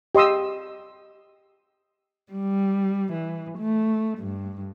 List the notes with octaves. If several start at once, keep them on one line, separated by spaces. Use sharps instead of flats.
G4 D#5 C6 D#6 E6
G3
E3
A3
G2